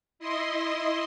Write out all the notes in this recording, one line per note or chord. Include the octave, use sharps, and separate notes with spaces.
E4 D#5 C6